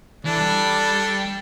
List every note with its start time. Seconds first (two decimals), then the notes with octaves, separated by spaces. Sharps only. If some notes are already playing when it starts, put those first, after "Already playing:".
0.25 E3 D4 A4
0.40 G3